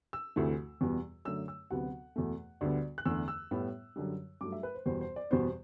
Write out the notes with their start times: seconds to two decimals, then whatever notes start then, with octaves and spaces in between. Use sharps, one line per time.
0.13 E6
0.36 D2 C3 E3 A3
0.81 E2 B2 G3 B3
1.25 F#2 D3 A3 E6
1.48 E6
1.71 D2 C3 F#3 B3 F#5
2.16 E2 B2 A3
2.61 D2 D3 G3 B3 D5
2.98 F#6
3.05 E2 D3 A3 E6
3.28 E6
3.51 A2 G3 B3
3.96 F#2 D3 G3
4.41 G2 F#3 A3 D6
4.52 E5
4.63 B4
4.75 C5
4.86 E2 B2 G3 B3 C5
5.01 C5
5.16 D5
5.31 E2 B2 G3 B3 C5